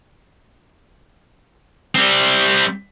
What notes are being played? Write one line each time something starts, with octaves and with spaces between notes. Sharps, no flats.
G3 C4